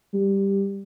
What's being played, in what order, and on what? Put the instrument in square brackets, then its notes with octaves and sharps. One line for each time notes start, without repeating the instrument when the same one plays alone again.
[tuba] G3